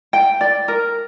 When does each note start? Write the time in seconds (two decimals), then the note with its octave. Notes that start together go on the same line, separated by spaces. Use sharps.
0.13 G5
0.41 D5
0.68 A#4